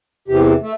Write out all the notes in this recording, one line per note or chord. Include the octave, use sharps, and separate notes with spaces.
E2 C3 E3 G4
A3